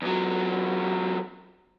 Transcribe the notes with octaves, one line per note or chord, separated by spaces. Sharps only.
E2 F#3